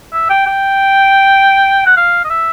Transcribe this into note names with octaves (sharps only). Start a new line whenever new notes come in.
E5
G5
G5
F#5
F5
D#5
E5